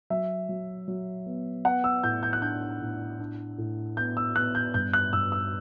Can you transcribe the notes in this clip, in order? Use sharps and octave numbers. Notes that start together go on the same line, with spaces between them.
F#3 E5
F#3
F#3
B3
B3 F#5
E6
A2 G6
G6
F#6
D4 G6
A2
D4
A2
B3 G6
E6
B3 F#6
G6
G2 G6
F#6
G2 E6
E6